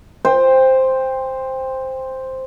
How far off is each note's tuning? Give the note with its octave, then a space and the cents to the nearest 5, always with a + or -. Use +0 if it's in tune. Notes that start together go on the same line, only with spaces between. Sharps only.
C5 +0 G5 +25